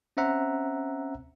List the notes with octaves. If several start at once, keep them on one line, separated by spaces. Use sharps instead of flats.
C4 C#4 C5 E5 F#5 A#5